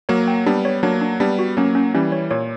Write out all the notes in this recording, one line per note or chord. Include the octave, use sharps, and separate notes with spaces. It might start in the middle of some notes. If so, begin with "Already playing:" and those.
F#3 A#3 C#5
G5
G3 B3 D4
C#5
F#3 A#3 D4
D4
G3 B3 D4
F#4
F#3 A#3 C#4
C#4
E3 G3 C#4
C#5
A#2 C#5